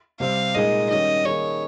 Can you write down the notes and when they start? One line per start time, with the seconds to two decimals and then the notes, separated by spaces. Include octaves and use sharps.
0.20 C3 G3 C4 F5
0.55 A#2 G#3 D#4 G#4 D#5
0.90 D#3 G3 C#4 G4 D#5
1.25 D#3 A#3 D#4 G#4 C#5